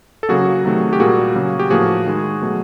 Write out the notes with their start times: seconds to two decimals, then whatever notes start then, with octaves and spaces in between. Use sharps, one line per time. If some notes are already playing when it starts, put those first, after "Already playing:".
0.23 A4
0.29 C#3 F#3 A#3 F#4 G#4
0.65 C3 D#3 F#3 A3
0.93 G4
1.00 A#2 G3 A#3 F#4 G#4
1.35 C#3 F#3 A#3
1.59 G4
1.70 A2 F3 A#3 F#4 G#4
2.06 D#3 G#3
2.42 B2 F#3 A3